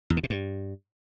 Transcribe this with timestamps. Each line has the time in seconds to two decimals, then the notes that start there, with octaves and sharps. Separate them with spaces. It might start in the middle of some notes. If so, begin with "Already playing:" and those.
0.10 E2
0.17 D3
0.23 B2
0.30 G2